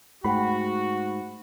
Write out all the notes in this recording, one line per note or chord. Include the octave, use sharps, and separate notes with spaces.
G#2 A3 F#4 F#5 G5 B5